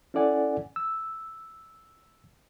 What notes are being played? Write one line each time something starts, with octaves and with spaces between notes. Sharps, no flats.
C#4 E4 A4 D5 F#5 G#5
E6